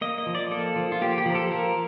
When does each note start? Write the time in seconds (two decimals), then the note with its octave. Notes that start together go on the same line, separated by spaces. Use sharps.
0.01 A#3 D#5
0.18 D#5
0.27 F3
0.35 D5
0.51 A#3 A4
0.76 F3
0.92 F4
1.01 A#3 G4
1.18 G4
1.26 F3 A#4
1.35 A4
1.51 A#3 A#4